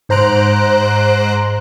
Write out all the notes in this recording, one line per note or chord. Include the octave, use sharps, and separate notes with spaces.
G#2 C5 A#5 F#6 D7